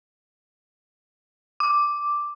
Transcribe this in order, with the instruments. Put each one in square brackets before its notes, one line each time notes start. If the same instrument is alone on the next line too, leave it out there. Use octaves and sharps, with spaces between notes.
[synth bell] D6